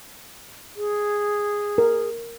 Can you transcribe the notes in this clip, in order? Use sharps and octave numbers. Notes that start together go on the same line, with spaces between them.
G#4
A#4